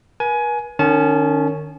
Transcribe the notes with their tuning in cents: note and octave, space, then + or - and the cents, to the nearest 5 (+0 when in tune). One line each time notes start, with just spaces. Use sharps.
B4 -45 G#5 +20
D#3 -35 C#4 +0 A5 -30